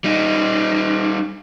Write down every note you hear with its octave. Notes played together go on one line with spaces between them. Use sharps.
G3 D#4